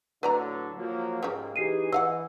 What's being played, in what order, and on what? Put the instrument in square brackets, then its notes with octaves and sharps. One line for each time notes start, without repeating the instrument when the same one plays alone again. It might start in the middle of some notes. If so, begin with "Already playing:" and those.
[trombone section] A2 D3 F#3 [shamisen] B4 D5 A#5
[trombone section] F3 F#3 A#3
[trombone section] G#2 A#3 [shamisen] C#3 G3
[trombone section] E3 D#4 G#4 [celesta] G4 C7 D#7
[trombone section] E3 [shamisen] D#5 F5 F#5 [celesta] E6